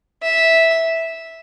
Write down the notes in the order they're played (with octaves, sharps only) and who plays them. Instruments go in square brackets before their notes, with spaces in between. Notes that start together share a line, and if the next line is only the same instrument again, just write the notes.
[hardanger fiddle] E5